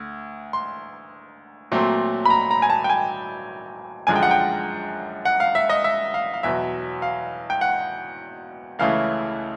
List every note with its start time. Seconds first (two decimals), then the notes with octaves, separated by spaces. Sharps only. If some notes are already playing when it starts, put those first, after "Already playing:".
Already playing: D2
0.53 C6
1.72 A#2 F#3 A3 C4
2.25 B5
2.30 A#5
2.51 A#5
2.62 G#5
2.70 A5
2.84 G5
2.90 G#5
4.07 F#2 D3 F3 G#3 G#5
4.16 G5
4.23 F#5
4.31 G5
5.25 F#5
5.40 F5
5.55 E5
5.69 D#5
5.84 E5
6.14 F5
6.34 F5
6.43 E2 B2 F#3 E5
7.02 F5
7.50 G5
7.61 F#5
8.79 C#2 C#3 E3 A3 F5